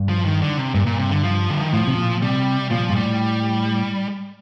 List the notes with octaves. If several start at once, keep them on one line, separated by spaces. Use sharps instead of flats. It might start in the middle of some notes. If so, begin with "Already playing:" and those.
Already playing: G2
F3
D#3
D3
C3
G2 A#2
G2 A#2
C3
D3
F3
D3
D#3
A2 F3
C3
A#2
C3 G3
A#2 F3
G2
A2 G3